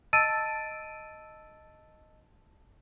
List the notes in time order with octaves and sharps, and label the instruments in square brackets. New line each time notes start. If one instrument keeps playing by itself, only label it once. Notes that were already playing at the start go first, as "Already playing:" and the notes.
[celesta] D#5 A5 E6 A6 D7 D#7